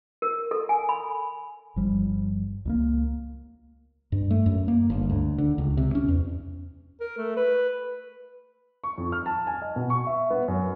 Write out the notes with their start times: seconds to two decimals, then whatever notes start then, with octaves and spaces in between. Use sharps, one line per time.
0.22 A#4
0.51 A4
0.69 G#5
0.89 B5
1.76 G1 F3 G3
2.65 C#2 G3 A#3
4.12 G2
4.31 A3
4.46 F#2
4.68 A#3
4.90 G1
5.10 D2
5.38 D3
5.58 C#2
5.77 C3
5.95 C#4
6.08 E2
7.00 A#4
7.18 A3
7.37 B4
8.84 C#6
8.98 F2
9.12 F6
9.26 A5
9.47 G#5
9.62 D#5
9.76 B2
9.90 C#6
10.07 E5
10.30 B3
10.48 F#2